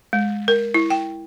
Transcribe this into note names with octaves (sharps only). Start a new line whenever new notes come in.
G#3
A#4
E4
G5